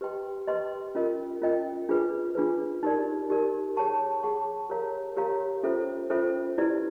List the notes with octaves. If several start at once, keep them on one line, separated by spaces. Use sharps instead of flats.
G4 B4 D#5 G5 C6
G4 B4 D#5 G5 C6
C#4 F4 A#4 D#5 G5
C#4 F4 A#4 D#5 G5
D4 F4 G#4 B4
D4 F4 G#4 B4
D#4 G4 A#4 D5
D#4 G4 A#4 D5
G#4 C#5 F#5 A5 C#6
G#4 C#5 F#5 A5 C#6
G4 A#4 C#5 F5 A#5
G4 A#4 C#5 F5 A#5
C#4 F4 A4 C5 E5
C#4 F4 A4 C5 E5
E4 G4 B4 D5